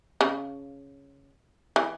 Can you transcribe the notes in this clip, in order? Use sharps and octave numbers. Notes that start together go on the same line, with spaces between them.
C#3
E3